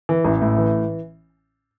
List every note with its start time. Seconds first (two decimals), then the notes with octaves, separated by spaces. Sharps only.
0.09 E3
0.25 A1
0.41 A2
0.58 E3